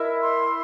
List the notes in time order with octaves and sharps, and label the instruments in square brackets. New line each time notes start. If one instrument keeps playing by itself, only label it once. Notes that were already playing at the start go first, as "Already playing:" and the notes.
Already playing: [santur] E4 E5 [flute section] A#4 D#5
[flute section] C6